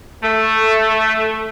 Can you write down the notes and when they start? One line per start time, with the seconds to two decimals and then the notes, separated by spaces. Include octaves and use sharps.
0.23 A3